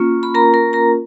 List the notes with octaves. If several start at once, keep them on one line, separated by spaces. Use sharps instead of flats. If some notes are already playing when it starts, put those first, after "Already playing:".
Already playing: A#3 C#4 F4
B5
A#4 A#5
A#4 A#5
A#4 A#5